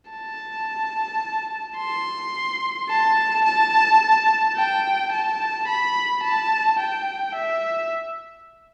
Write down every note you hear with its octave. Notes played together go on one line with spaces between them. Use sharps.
A5
C6
A5
A5
G5
A5
B5
A5
G5
E5